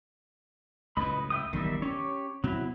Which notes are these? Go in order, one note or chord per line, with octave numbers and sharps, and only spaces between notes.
C#2 F#2 A2 B4 D#5 B5
E5 G5 D#6
E1 B1 F#2 D#3 G3 E5
C#4 G4 C#5
B2 F#3 C4 E4